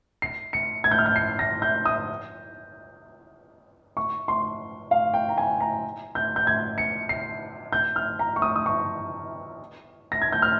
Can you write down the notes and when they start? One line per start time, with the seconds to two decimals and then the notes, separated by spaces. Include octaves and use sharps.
0.22 C7
0.53 C#7
0.84 G#6
0.91 G6
0.99 F6
1.06 G6
1.16 C7
1.39 A#6
1.62 G6
1.86 D#6
3.97 C#6
4.28 C6
4.91 F5
5.14 G5
5.29 A#5
5.38 G#5
5.60 A#5
6.15 G6
6.36 G6
6.47 G#6
6.78 C#7
7.09 C7
7.73 G6
7.96 F6
8.19 A#5
8.36 C#6
8.42 D#6
8.56 D#6
8.66 C#6
10.12 A#6
10.22 G#6
10.32 G6
10.42 F6